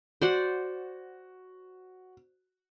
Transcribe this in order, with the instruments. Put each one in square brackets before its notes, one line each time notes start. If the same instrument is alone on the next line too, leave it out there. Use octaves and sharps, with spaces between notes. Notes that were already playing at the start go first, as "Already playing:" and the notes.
[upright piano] F#4 [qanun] C5 D5 F#5